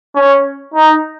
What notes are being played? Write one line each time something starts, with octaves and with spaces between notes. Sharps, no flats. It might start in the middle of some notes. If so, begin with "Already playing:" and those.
C#4
D#4